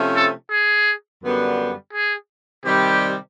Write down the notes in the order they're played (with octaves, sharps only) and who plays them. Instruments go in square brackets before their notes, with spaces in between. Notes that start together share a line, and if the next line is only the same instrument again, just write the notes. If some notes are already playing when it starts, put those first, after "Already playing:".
Already playing: [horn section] C3 F3 A3 C#4
[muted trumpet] A4
G#4
[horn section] F#2 D3 G3 B3
[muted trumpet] G#4
[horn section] C3 D#3 G3 [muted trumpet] G4